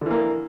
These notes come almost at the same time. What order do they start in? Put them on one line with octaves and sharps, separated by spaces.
D3 E3 A#3